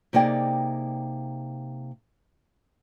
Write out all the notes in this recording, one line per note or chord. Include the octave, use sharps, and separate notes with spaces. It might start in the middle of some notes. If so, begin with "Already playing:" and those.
C3 A#3 D#4 G#4 D5 G5